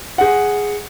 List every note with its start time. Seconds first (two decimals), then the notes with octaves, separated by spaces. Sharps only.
0.18 G#4 F#5